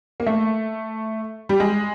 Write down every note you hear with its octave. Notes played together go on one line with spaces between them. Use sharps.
A#3
A3
G3
G#3